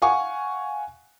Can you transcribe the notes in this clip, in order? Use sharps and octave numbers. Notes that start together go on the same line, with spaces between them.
F5 F#5 G#5 C#6